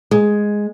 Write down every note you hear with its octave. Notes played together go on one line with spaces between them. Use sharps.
G#3